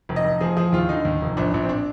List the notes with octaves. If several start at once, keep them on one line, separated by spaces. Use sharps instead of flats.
F1
D#5
F1
F3 G#4
F3 G#4
D#2 F4
D3 D#4
D#2
F1
A#1 D4
A#1 D4
C4
D4